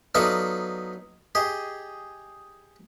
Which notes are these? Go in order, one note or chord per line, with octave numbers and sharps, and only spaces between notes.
F#3 B3 D#4 F4 A4 D5
G4 G#4 D#5